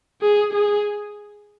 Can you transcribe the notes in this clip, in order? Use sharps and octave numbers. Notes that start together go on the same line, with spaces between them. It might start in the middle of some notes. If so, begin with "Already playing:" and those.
G#4
G#4